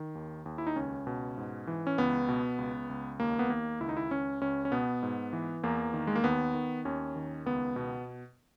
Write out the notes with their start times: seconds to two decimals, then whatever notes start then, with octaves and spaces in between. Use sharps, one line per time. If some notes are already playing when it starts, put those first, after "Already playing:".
Already playing: D#3
0.15 D#2
0.46 D#2
0.58 E4
0.67 D#4
0.76 C#2 C#4
1.07 B2
1.38 G#2
1.67 E3
1.87 C#4
1.98 C#2 B3
2.29 B2
2.58 C#2
2.89 C#2
3.20 D#2 A#3
3.39 B3
3.50 D#3 A#3
3.81 C#2 E4
3.89 D#4
3.97 E4
4.11 C#2 C#4
4.41 C#2 C#4
4.65 C#4
4.72 B2 B3
5.03 G#2
5.33 E3
5.63 E2 A#3
5.94 D#3
6.07 G#3
6.15 A#3
6.24 D#2 B3
6.54 D#3
6.85 D#2 C#4
7.16 D#3
7.46 C#2 B3
7.76 B2